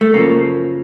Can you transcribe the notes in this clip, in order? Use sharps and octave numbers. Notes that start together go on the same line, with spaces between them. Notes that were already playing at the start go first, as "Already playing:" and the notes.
A3
F#2 C#3 F3 A#3